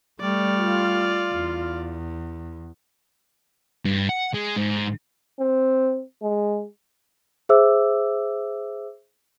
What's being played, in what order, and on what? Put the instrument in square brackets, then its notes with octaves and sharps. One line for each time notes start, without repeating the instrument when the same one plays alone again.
[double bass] G3 A3 [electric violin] D5 F6
[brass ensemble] F4
[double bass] E2
[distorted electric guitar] G2
F#5
G#3
G#2
[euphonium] C4
G#3
[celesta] G#4 C5 E5 D6 E6